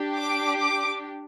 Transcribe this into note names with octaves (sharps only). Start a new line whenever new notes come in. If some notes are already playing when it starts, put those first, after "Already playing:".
Already playing: D4 G4
D6
D6